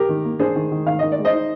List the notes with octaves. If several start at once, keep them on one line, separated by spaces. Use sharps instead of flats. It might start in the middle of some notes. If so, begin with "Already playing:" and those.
Already playing: G4 A#4
D#3
A#3
D4 G#4 C5
D#3
D#3
D#3 F5
D#3 D#5
D5
G#3
C5 D#5
D#4